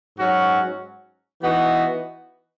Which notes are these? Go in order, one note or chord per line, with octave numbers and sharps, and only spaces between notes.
G#2 F#3 C#4 F#4
E3 B3 D#4 F#4